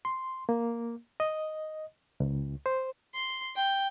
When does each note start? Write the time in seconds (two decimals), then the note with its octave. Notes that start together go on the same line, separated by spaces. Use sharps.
0.05 C6
0.49 A#3
1.20 D#5
2.20 C#2
2.66 C5
3.14 C6
3.55 G5